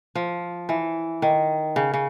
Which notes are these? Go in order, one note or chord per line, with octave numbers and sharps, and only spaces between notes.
F3
E3
D#3
C#3
C#3